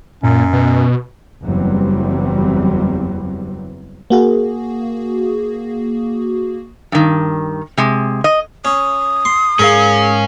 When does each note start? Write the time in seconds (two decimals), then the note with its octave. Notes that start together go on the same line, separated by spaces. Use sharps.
0.23 F#2 A#2
0.53 B2
1.43 F#1 E2 E3 F#3 G3 C4
4.10 A#3 F#4 G#4
6.92 G2 D#3
7.78 C3 G#3
8.24 D#5
8.65 C#4 D#6
9.25 C6
9.59 G#2 C#4 G#4 A#4 F5